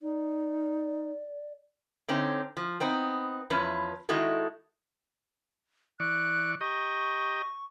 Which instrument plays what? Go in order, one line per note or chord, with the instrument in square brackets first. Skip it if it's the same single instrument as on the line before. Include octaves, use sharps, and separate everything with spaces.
[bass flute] D#4 [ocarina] D5
[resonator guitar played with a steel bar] D3 C4 C#4 D#4
F3
B3 C4 D#4
E2 F3 C#4 B4
D#3 G#3 D#4 E4 F#4 A4
[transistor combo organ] E3 D5 C#6 [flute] F#6
[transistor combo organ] G4 D#5 A#5 [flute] C#6